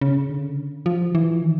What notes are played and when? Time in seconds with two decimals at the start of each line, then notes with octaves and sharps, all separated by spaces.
0.01 C#3
0.30 D3
0.86 F3
1.15 E3
1.42 D#3